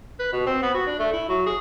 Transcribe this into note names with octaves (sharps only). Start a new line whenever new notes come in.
B4
B2
C4
B3
F#4
D4
A3
E4
F#3
G#4